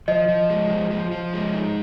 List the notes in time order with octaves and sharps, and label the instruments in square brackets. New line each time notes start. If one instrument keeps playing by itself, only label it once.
[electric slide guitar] F3 [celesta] D#5
[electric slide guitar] F3
G#3
F3
F3
F3
G#3
D#4